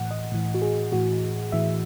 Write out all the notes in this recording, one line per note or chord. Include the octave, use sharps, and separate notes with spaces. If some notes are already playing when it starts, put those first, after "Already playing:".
Already playing: A2 E3 F#5
D#5
A2 E3
F#4
G#4
A2 E3 F#4
A2 E3 E5